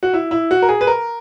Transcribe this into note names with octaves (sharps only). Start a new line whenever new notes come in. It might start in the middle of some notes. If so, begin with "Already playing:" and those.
F#4
E4
E4
F#4
A#4
G#4
B4
A#4